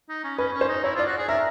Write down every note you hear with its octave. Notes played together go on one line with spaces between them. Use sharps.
D#4
C#4
C#4 B4
C#4
C5
D#4
E4 C#5
F4
D5
F#4
G#4
A#4 E5